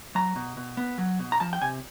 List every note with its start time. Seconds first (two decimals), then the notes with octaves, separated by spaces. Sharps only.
0.15 F#3 A#5
0.36 B2
0.57 B2
0.77 B3
0.98 F#3
1.19 B2
1.32 A#5
1.40 F3 A5
1.53 G5
1.61 C3 G#5